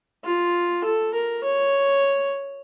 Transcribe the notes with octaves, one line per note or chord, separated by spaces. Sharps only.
F4
A4
A#4
C#5